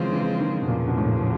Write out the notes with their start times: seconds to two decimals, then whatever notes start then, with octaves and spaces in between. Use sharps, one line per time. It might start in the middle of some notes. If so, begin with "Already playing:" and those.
Already playing: C#3 E3 F3 G#3 C4 F4
0.12 E3
0.40 D#3
0.62 B2
0.68 E2 A#2 C#3 F3
0.87 B2
0.98 A2
1.05 A#2